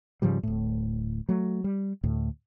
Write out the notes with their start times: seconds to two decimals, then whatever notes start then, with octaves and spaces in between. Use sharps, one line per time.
0.22 G#2 C#3 F3 G3
0.43 D1 A2
1.29 F#3 A3
1.64 G3
2.04 D2 A2